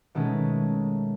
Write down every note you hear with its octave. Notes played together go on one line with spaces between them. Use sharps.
B2 D#3 G#3 A3 C#4 G#4